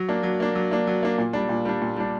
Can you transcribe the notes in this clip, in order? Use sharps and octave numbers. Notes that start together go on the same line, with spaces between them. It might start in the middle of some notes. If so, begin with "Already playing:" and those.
Already playing: F#3
A#3 D4
F#3
A#3 D4
F#3
A#3 D4
F#3
A#3 D4
A#2
G3 D4
A#2
G3 D4
A#2
G3 D4